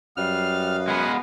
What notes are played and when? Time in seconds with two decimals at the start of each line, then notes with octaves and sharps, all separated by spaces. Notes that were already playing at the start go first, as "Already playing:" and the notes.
0.17 F#2 G3 B4 D#5 F5 F6
0.88 G#3 B3 F#5 G#5